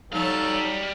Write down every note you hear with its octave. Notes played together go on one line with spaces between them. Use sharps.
F#3 G3 D#4 A4 F5